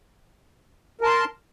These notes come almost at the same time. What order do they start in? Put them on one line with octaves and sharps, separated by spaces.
A#4 A5 C6